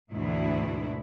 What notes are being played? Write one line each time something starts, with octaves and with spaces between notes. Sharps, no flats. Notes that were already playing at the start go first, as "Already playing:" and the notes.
D2 G#2 B2 E3 E4